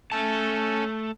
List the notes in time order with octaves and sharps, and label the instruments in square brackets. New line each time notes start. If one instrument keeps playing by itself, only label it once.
[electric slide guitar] A3 A5 [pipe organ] C#4 A4